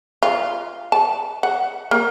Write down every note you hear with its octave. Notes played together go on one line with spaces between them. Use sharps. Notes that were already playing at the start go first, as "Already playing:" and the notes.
F4
A5
F#5
A#3